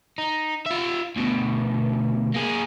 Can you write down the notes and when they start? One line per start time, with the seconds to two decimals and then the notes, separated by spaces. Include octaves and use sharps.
0.18 D#4
0.66 F4 E5
1.16 D2 B2
2.34 A#3 G#4